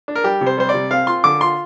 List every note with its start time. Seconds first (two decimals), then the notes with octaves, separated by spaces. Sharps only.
0.08 D4
0.15 A#4
0.24 G3 G4
0.41 C3
0.46 C5
0.58 G3 C5
0.69 D5
0.74 C3
0.91 C4 F5
1.07 F4 C6
1.24 D3 D6
1.41 F4 C6